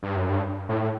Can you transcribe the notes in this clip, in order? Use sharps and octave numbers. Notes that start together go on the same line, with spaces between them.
G2
F#2
G2
A2